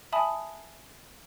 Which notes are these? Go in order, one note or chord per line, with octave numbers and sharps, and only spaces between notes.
E5 G#5 A5 B5 D#6